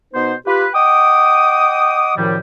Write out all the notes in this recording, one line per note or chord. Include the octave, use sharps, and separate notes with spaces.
B2 B3 D#4 C5
F4 G4 B4
D#5 F#5 G5 D6 D#6
F#2 A2 D#3 F3 G3